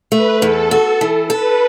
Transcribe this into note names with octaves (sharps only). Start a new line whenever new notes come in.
A3 B4
E2 A4
F#4
E3
A4 B4